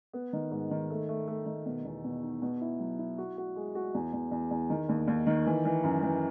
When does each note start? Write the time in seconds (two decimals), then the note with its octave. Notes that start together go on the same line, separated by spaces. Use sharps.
0.13 B3
0.33 D#3
0.51 G#2
0.71 D#3
0.90 A3
1.09 A3
1.28 A3
1.46 D#3
1.66 B2
1.85 E2
2.04 B2
2.23 D#4
2.42 B2
2.61 E4
2.79 F#3
2.99 E4
3.18 F#4
3.37 F#4
3.56 G#3
3.75 F#4
3.94 E2
4.13 E2
4.31 E2
4.51 E2
4.70 D#3
4.89 D#2
5.07 D#2
5.27 D#3
5.46 E3
5.65 E3
5.84 F#2
6.03 E3